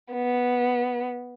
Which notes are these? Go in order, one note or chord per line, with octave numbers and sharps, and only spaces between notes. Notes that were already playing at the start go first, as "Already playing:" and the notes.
B3